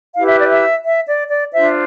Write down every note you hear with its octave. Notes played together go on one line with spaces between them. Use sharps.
E4 G4 B4 F5
E5
D5
E5
E5
D5
D5
D4 F4 C5 E5